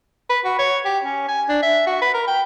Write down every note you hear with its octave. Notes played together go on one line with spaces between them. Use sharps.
B4
F#4
C#5
G4
C#4
G#5
D4
E5
F#4
B4
A#4
G5